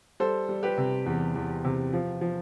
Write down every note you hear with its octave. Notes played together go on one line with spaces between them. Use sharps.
G3 A4 C5
G3
G4 B4
C3
E2
E2
C3
F3
F3